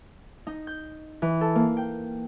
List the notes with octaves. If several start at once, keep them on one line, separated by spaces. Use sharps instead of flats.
D#4
G6
E3
A4
A#3
G5